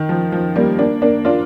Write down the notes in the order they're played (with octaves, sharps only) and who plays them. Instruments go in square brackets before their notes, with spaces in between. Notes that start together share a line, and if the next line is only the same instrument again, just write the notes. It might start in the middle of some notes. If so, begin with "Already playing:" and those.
Already playing: [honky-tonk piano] D#3
F3
F3
G3 A#3
A#3 D4
A#3 D4
D4 F4